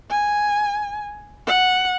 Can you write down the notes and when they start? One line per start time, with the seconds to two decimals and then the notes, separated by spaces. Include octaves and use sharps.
0.11 G#5
1.47 F#5